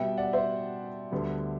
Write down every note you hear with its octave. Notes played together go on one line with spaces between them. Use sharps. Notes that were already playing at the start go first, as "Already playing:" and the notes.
Already playing: B2 G3 B3 E5 G5
D5 F#5
C5 E5
D2 D3 G3 B3